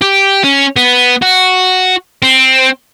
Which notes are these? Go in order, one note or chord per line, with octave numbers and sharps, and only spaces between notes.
G4
C#4
B3
F#4
C4